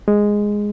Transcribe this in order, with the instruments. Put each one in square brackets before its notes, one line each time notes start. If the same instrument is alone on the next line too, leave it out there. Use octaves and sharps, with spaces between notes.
[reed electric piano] G#3